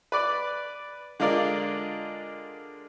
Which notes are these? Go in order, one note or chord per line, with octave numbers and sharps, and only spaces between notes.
B4 D5 D6
D3 G#3 F4 A#4 D5